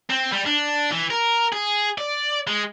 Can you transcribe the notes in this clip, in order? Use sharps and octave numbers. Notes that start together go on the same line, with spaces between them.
C4
G3
D4
E3
A#4
G#4
D5
G#3